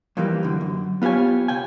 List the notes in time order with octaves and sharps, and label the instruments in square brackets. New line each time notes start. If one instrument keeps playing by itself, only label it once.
[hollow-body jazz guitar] F2 E3 G3 A#3
F#2 D3
F#2
B3 F4 G4 C#5 G#5
C#2 C3 G5 G#5